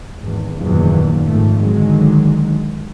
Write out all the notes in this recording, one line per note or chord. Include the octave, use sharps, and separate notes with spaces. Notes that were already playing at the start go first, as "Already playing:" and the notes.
G#1 E2
F#1 E2 A#2 D#3 F3 F#3
G#1 F3 A3
D3 D#3 F#3 G#3